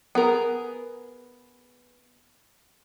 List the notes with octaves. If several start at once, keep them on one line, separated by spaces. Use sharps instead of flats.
B3 G#4 A#4